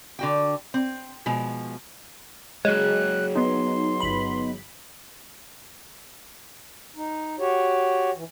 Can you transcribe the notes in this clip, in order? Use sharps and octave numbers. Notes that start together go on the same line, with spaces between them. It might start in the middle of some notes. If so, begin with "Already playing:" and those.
D3 F#4 G5
C4
B2 F3 G#3
F#3 G#3 G#4 C#5 F#6
B3 D#4 C6
G1 B5
D#4
F#4 G4 C#5
E3